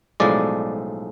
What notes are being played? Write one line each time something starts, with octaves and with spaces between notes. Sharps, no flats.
B1 A2 F3 G#3 D5